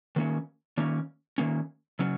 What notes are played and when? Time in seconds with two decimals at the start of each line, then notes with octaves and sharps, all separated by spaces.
0.16 D#3 A#3 C#4
0.77 D#3 A#3 C#4
1.38 D#3 A#3 C#4
1.99 C#3 F#3 C#4